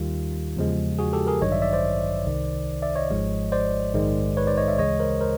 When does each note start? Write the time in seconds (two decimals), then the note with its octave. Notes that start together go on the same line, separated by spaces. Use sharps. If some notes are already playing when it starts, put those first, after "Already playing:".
Already playing: D#2 D#3 G3 F4 G4
0.57 E2 C#3 F3 G#3
0.99 F#4 G#4
1.13 G4 A4
1.27 G#4 A#4
1.41 A1 G2 D#3 F#3 C#5 D#5
1.52 D5 E5
1.62 D5 E5
1.73 C5 D5
2.26 C2 C3 D#3
2.82 D5 E5
2.96 C#5 D#5
3.10 G#1 G#2 F3 G#3
3.52 C5 D5
3.94 A#1 G#2 D#3 G#3
4.37 B4 C#5
4.47 C5 D5
4.57 C#5 D#5
4.68 D5 E5
4.78 D2 C#3 E3 G#3 C#5 D#5
5.00 A#4 C5
5.21 A#4 C5